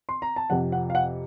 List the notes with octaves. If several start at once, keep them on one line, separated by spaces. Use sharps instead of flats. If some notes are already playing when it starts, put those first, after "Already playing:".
C6
A#5
A5
F2 C3 F3 F#5
F#5
F5
F#5